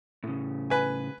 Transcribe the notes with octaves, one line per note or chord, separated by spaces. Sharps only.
A2 C#3
B4 G#5